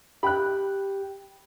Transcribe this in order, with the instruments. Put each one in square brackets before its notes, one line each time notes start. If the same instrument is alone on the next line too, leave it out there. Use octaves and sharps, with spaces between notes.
[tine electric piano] G4 G5 [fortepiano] B5 F#6